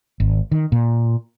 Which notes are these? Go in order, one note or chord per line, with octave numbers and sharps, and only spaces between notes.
G#1
D#3
A#2